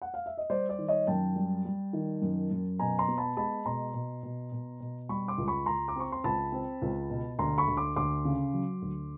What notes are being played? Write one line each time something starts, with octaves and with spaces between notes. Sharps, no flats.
F#5
F5
E5
D#5
G3 C5 D5
C5 D5
D#3
C#5 D#5
F#2 G5 A5
G3
G3
D#3
F#2
F#2
B2 G#5 A#5
A#5 C6
B3
A5 B5
G#3 A5 B5
B2 A#5 C6
B2
B2
B2
B2
G3 B5 C#6
C6 D6
C#2
B5 C#6
C#2 A#5 C6
D6
C4 C#6
C6
C#2 A5 B5
C4
C#2
B2
D2 A#5 C6
B5 C#6
D2
C6 D6
D2 C6 D6
C#3
F#3
D2